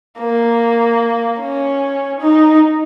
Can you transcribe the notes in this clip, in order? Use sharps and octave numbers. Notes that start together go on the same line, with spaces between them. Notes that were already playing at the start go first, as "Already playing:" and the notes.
A#3
C#4
D#4